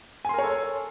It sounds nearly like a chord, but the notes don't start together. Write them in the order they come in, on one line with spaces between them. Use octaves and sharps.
G#5 C6 A#4 C#5 A4